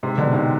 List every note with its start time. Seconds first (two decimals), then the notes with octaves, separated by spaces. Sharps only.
0.03 G#2 C3
0.18 B2 D3
0.33 C3 D#3